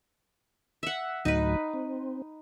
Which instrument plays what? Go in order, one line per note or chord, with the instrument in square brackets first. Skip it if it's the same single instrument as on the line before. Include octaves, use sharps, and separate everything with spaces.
[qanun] E5 F#5
[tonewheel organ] D2 A2 F#3 [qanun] D#4 B4
[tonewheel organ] C4